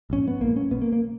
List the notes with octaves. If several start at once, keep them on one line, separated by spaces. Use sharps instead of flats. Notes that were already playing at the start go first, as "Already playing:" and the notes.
A#1 G#2 C#4
B3
A#1 G#2 A#3
C#4
B1 B2 B3
A#3
A#3